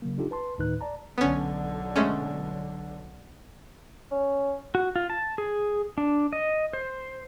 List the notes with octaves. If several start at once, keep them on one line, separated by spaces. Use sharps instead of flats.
C#3 F#3 A#3
D4 D#4 F4 G4 A4
B4 A5 C6
D2 A2 D#3 D#4 B4 F#6
D5 A5 A#5
B1 D3 B3 C#4
G#3 A3 C#4
C#4
F#4
F4
A5
G#4
D4
D#5
C5